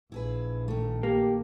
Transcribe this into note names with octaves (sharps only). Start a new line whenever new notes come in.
A#1 E4 G#4 B4
D#3 A3
A#3 G4